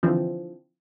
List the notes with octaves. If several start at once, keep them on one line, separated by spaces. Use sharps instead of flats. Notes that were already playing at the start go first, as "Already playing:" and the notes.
D3 E3 F3 C4